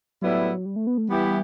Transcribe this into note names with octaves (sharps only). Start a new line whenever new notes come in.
A2 F#3 G3 B3 E4
G3
A3
B3
A3
E3 G3 B3 E4 G4